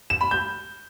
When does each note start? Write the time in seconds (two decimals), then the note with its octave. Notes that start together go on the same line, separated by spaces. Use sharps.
0.10 E7
0.21 B5
0.31 G6